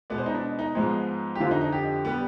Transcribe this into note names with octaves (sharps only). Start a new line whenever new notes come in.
B2 G#3 B3 D5
C5
D#4
D4
D#4
G#2 F3 G#3 B3
G4
F2 D3 F3 F4
D#4
D#4
G4
G3 B3